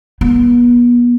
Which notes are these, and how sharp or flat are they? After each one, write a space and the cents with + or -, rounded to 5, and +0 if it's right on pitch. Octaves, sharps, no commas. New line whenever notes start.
B3 -35